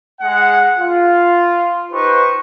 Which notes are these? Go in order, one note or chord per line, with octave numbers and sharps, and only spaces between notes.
G#3 G#4 F#5
F4
D#4 G4 B4 C5 C#6